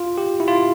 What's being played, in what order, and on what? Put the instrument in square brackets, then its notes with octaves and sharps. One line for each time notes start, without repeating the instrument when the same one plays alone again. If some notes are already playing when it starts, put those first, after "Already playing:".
Already playing: [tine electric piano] F4
G4
E4
F4